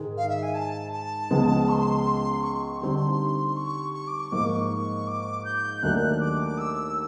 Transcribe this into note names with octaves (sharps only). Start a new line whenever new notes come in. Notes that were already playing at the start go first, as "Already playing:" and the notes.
Already playing: G#2 D#3 G#3
F5
E5
G#5
A5
A5
C#2 C#3 F3 G#3 B3
C#6
C6
C#6
D3 G3 C4 D#4 C6
C#6
C#6
D6
C#6
G#2 F3 A#3 D6
C#6
D6
G6
D#2 D#3 F#3 A3 D4 F#6
D6
E6